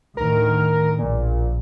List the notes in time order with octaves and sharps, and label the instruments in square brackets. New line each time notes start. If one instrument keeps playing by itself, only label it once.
[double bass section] D2 A2 D#3 [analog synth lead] A#4
[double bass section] A#1 [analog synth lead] A#2